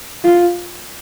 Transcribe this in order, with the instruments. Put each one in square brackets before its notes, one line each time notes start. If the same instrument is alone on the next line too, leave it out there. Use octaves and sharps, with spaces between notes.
[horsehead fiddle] F4